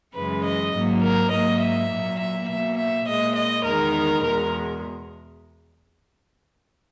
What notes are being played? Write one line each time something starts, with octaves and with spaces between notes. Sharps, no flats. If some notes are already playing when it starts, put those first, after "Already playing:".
F#2 C#3 E3 G#3 B4
D#5
G#2 F#3 A#3
A#4
G#2 F#3 A#3 D#5
E5
A#2 F#3 A#3
E5
B2 A#3 E5
E5
A#2 G#3 D#5
D#5
E2 D#3 G#3 A#4
E2 B2 G#3 A#4